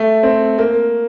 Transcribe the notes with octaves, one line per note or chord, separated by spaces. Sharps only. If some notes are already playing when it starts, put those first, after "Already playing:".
Already playing: A3
C4
A#3